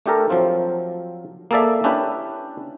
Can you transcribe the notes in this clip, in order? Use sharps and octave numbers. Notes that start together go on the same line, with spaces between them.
A3 D4 G4 A4 A#4
F3 F#3 C4 F4
A#3 G#4 A4 D5 E5
C#4 D4 E4 G4 B4